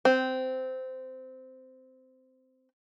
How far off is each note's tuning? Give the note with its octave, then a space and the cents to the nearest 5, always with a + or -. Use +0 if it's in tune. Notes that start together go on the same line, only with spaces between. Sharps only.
C4 -15